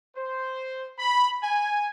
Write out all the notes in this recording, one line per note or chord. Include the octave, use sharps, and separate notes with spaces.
C5
B5
G#5